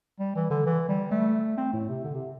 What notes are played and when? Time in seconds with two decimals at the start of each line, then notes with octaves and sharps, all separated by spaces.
0.19 G3
0.36 E3
0.50 D3
0.66 E3
0.88 G3
1.11 A3
1.57 C4
1.73 A2
1.89 C3
2.04 D3
2.15 C3